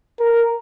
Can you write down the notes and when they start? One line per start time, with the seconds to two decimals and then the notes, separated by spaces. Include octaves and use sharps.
0.20 A#4